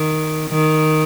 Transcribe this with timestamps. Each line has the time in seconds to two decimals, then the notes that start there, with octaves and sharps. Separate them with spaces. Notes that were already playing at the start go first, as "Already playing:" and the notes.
Already playing: D#3
0.50 D#3